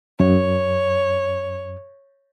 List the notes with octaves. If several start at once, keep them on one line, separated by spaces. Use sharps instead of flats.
F#2 C#5